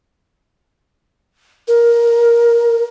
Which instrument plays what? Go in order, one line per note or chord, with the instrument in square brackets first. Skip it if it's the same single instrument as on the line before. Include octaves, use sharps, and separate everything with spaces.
[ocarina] A#4